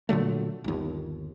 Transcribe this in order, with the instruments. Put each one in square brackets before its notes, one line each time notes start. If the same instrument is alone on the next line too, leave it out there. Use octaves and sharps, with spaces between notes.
[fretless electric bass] A#2 D3 F#3 A3
G1 D#2